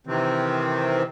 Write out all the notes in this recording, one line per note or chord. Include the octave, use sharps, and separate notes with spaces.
C3 D#3 E3 C4